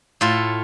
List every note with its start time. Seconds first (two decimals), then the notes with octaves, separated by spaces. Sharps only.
0.21 A2 F4 A4